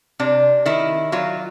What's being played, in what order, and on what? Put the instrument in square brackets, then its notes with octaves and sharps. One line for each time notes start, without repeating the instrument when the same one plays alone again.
[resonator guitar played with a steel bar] C3 D4
D#3 E4
F#3 F4